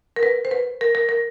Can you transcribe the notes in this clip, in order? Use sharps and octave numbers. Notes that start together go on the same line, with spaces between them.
A#4
B4
C5
B4
A#4
A#4
A#4